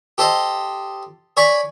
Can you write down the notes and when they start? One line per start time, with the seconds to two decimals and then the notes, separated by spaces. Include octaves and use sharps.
0.18 G4 A4 C5 D#5
1.37 C#5 D5 G#5 B5 C#6